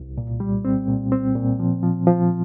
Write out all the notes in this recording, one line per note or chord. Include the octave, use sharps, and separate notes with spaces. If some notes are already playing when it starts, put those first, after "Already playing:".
Already playing: C2
A#2
G3
C4
A#2
C4
A#2
F3
F3
F3